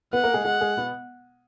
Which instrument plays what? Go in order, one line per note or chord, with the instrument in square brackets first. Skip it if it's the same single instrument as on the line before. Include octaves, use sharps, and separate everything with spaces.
[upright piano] B3 B4 [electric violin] F#5
[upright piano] A#3 A#4
G#3 G#4
[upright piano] G#3 G#4 [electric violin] F#5
[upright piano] G#3 G#4
B2 B3